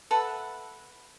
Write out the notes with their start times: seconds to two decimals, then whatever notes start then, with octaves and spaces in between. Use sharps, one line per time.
0.11 A4 B4 E5 F#5